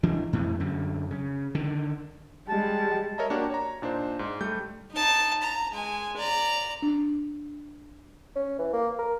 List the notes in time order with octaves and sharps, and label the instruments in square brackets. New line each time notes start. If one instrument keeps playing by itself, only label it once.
[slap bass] E3 D4
F2 A2 E3
F#2 D3
C#3
D3 D#3
[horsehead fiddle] G3 G#3 [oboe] A5
[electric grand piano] A#4 C#5 D#5 E5 A#5
A#3 D4 F#4 G4 A#4 C#5
C#5 A#5
A#2 D4 D#4 C5
G#2
G3 A3 G6
[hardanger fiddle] D#4 A5
A#5
G#3 G#5
D5 A#5
[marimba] D4
[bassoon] C#4
E3
A#3
A#4